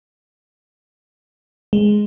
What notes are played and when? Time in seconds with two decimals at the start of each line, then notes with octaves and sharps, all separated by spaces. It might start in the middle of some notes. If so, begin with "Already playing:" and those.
1.73 G#3